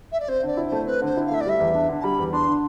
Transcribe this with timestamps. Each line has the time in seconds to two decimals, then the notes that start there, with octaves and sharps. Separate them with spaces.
0.12 E5
0.20 D5
0.28 C4 C5
0.43 D3 D5
0.57 E4
0.67 A3 C5
0.86 C4 B4
1.02 D3 C5
1.16 E4
1.25 F5
1.31 A3 E5
1.40 D5
1.46 G3 E5
1.60 E2
1.74 D4
1.89 D3
2.00 A5
2.03 G3 B5
2.18 E2
2.32 D4 C6
2.48 D3